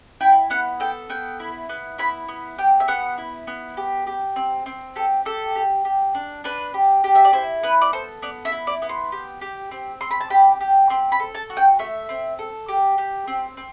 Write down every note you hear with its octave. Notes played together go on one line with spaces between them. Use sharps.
E4 G5
B3 F#5
A4 G5
B3 G5
E4
B3
E4 B5
B3
G4 G5
E5
B3 F#5
E4
B3
G4
G4
C4
C4
G4 A4
G4 A4
G4
G4
D4
D4 B4
G4
G4
E5
D5
E4 C5
B3 B4
D5
A4 C5
B3 D5
E5
E4
D5
B3
C6
G4
G4
C4
C4 C6
B5
A5
G4 B5
G4
C4 C6
B5
A4
A5
F#4
G5
A3 E5
C4
A4
G4
G4
C4
C4